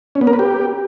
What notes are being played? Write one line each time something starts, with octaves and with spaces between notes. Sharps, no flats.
C#4
B3
A#4
B4
G4